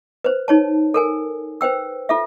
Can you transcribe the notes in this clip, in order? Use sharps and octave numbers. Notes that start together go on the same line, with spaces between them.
B4 C5
D#4 C#5 A5
A4 A#4 G#5
B4 C5 G5 E6
F4 A4 E5